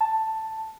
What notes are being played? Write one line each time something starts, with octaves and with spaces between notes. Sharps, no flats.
A5